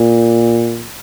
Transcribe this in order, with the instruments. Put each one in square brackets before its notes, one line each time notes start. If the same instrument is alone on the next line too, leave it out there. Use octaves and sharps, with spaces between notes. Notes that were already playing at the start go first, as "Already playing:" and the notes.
Already playing: [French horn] A#2